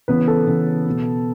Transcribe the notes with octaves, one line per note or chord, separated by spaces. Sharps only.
C#3 E3 B3 B4
A4
C#3 E3 B3
B2 B3